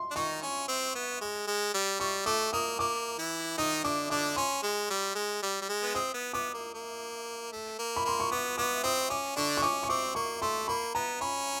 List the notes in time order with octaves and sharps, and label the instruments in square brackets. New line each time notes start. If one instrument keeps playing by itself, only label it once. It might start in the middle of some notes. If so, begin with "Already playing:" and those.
Already playing: [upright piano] C6
[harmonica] D4
[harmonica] D#3 D#4 [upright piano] C#6
[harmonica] C#4
C4
B3
G#3
G#3
G3
[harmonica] G3 [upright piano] C#6
[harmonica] A3 [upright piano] D6
[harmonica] A#3 [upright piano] D#6
[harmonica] A#3 [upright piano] D6
[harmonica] E3 E4
[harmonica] D#3 D#4 [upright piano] D#6
[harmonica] D3 D4 [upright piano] D6
[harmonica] D3 D4 [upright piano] D6
[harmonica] C#4 [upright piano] C6
[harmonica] G#3
G3
G#3
G3
G3
G#3
B3
[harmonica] C4 [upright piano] D#6
[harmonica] B3
[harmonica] B3 [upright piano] D6
[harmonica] A#3
A#3
A3
A#3
[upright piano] B5
[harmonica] A#3 [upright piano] C6
[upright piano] C#6
[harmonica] B3 [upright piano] D6
[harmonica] B3 [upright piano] D6
[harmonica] C4 [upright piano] D#6
[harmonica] C#4 [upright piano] D6
[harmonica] D3 D4 [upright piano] C#6
[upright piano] C#6
[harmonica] C#4 [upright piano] D6
[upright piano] C#6
[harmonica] C4 [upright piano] D6
[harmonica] A#3 [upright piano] C#6
[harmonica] A3 [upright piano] C6
[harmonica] A#3 [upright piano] B5
[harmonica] B3 [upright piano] A#5
[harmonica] C#4 [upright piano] B5